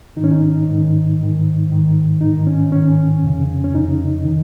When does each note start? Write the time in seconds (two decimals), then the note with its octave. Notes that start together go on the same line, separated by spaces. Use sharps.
0.17 G#2 D#3 D#4
0.24 C#4
0.31 D#4
0.68 G#2 D#3
1.19 G#2 D#3
1.70 G#2 D#3
2.21 G#2 D#3 D#4
2.47 C#4
2.72 G#2 D#3 C#4
3.23 F2 C#3
3.64 C#4
3.74 F2 C#3 D#4
4.25 D#3